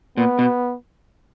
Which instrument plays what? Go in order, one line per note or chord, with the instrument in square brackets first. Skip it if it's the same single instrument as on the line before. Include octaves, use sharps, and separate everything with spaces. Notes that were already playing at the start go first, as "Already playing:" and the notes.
[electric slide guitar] A#2 [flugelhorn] B3
[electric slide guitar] B2